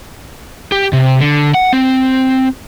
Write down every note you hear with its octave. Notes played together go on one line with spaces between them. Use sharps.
G4
C3
D3
F#5
C4